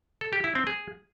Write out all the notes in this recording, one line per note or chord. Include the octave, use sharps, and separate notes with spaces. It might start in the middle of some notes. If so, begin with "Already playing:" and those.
A4
G4
E4
C4
G#4